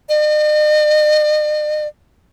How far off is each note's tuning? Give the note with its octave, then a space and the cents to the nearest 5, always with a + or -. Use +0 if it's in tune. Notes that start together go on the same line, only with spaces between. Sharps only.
D#5 -45